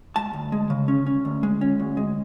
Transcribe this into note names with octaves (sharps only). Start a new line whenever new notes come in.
G#3 A5
D2
G#3
C#3
C#4
C#4
D2
G#3
C#4
D2
G#3